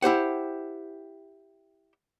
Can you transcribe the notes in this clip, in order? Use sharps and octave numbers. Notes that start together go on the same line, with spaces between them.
E4 G4 C5 F#5